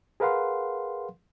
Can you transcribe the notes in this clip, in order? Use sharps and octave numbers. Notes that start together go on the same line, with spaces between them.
G#4 A#4 B4 F5 F#5 C6